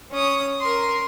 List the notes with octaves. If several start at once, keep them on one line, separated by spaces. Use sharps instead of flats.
C#4 D#6
A#4 C6